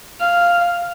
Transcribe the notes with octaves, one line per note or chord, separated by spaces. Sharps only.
F5